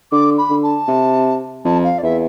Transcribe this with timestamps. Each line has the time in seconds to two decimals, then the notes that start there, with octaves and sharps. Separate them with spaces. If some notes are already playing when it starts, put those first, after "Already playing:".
0.12 D3 D6
0.38 B5
0.50 D3
0.63 A5
0.88 C3
1.64 F2 A5
1.84 F5
1.98 D5
2.03 E2 E5